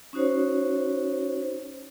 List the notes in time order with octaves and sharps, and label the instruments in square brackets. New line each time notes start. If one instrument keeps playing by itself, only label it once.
[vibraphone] C#4 D#4 F#4 C5 C#5